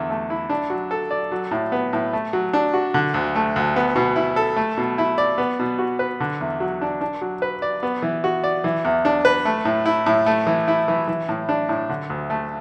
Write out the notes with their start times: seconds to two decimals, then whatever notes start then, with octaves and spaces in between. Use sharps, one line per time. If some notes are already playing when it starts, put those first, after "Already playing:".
Already playing: E2 D3
0.10 A3
0.30 E4
0.50 D4
0.70 F#3
0.91 A4
1.11 D5
1.32 F#3
1.51 A2
1.72 B3
1.93 A2
2.13 A3
2.33 F#3
2.53 D4
2.74 F#4
2.94 D3
3.14 D2
3.35 A3
3.56 D2
3.76 B3
3.96 B2
4.16 E4
4.36 A4
4.56 A3
4.78 B2
4.98 E4
5.18 D5
5.38 B3
5.59 B2
5.79 F#4
5.99 B4
6.20 D3
6.41 E2
6.60 F#3
6.81 D4
7.01 D4
7.21 F#3
7.42 B4
7.62 D5
7.83 B3
8.02 E3
8.24 F#4
8.44 D5
8.64 E3
8.85 E2
9.05 D4
9.25 B4
9.45 A3
9.65 A2
9.86 E4
10.06 A2
10.26 A3
10.47 E3
10.68 E4
10.88 E3
11.08 E3
11.29 A2
11.49 D4
11.69 A2
11.90 D3
12.10 D2
12.30 A3